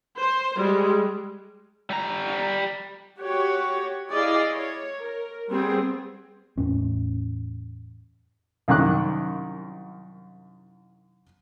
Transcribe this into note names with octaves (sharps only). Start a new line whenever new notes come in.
C5
G3 G#3
G3 A#5
F#4 G4 C#5
E4 G#4 D5 D#5 F5
C#5
A#4
G3 B3 C4 G#4
E2 A2 C#4
C2 F#2 D#3 D6 F#6